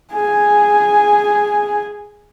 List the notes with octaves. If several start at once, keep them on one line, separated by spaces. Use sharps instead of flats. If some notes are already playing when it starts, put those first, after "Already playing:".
G#4 G#5